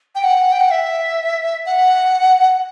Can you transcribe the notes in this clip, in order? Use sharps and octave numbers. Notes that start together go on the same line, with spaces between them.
G5
F#5
G5
F#5
E5
F#5